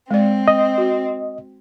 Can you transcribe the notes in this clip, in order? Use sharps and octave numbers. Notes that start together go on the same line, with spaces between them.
G#3 C4 D5
D#5
F#4